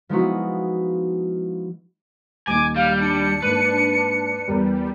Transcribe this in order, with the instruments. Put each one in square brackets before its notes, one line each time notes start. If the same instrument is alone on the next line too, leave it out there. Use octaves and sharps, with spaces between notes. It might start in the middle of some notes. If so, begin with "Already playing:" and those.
[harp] F3 G#3 B3 D#4 E4 F#4
[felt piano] D#1 A#2 D#4 [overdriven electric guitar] G#5 [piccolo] D6
[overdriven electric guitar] G3 [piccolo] F5
[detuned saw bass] D4 [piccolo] C#7
[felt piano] G#2 A#3 [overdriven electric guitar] B4
[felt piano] E2 A#4 D5 [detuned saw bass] G3